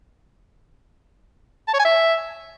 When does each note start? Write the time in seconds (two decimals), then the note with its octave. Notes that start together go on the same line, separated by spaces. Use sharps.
1.68 A5
1.73 C#5
1.79 G#5
1.85 E5